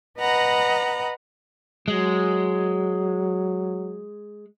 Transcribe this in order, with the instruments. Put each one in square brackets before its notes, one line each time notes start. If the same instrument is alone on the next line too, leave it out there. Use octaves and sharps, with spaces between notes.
[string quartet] B4 D#5 F#5 A#5 B5
[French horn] F#3 [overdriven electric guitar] G#3